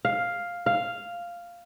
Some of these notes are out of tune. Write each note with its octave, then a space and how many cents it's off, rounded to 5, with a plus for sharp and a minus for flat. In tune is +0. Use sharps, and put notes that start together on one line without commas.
F5 +5
F5 -5